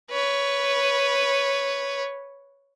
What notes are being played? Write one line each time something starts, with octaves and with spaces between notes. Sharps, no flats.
B4 C#5